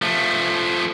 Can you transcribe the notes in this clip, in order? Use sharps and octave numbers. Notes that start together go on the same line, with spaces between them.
F3 A3